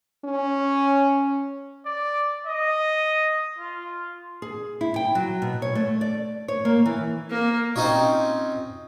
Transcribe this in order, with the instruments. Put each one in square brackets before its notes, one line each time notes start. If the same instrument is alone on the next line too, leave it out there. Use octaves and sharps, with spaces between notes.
[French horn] C#4
[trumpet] D5
D#5
F4
[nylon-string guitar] G#4
E4
G5
F#3
B2
C#5
A3
D5
C#5
A#3
E3
[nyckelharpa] A#3
[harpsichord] C4 C#4 D#4 F4 C#5